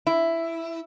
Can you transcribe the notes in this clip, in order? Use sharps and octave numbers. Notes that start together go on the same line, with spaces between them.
E4